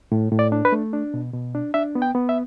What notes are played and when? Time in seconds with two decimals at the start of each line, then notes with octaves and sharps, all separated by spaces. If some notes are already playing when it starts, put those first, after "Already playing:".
0.12 A2
0.32 A2
0.39 D5
0.52 D4
0.65 B4
0.72 A3
0.93 D4
1.14 B2
1.33 B2
1.55 D4
1.74 D4 E5
1.95 B3
2.02 G5
2.15 B3
2.29 E5